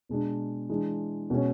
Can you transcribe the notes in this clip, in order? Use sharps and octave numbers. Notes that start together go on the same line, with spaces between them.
B2 G#3 D4
E3 G#3 D4
B2 G#3 C#4